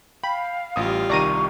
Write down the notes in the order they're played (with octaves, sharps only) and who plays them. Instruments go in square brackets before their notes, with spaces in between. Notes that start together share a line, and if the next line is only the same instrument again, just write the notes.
[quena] F5 [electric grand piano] G5 [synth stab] B5
[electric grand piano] A1 D#6 [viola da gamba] G3 F4
[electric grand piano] C2 D#3 [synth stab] D5 A#5 D#7 [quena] C#6